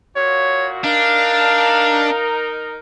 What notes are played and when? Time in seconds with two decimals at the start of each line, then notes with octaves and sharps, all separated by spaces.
0.16 A#2 F#4 C#5
0.84 D4 D#4 A#4 F5